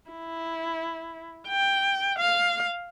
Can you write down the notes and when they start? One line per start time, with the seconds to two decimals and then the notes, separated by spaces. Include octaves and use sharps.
0.11 E4
1.47 G5
2.18 F5